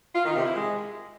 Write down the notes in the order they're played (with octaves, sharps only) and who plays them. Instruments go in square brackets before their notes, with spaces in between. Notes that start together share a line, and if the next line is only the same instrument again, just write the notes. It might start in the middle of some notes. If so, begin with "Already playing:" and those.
[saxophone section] F4
D#3
C3
E4
G#3